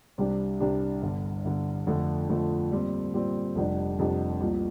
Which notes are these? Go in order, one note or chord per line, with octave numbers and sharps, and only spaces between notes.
C2 C3 G3 D4 G4
C2 C3 G3 D4 G4
G1 G2 D3
G1 G2 D3
F2 D3 F3 A3
F2 D3 F3 A3
A#2 G3 C4
A#2 G3 C4
F1 F2 C3 G3 D4
F1 F2 C3 G3 D4
C2 A#2 F3